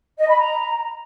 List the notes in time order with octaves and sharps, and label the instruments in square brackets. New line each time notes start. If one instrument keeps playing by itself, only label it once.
[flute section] D#5
B5
A#5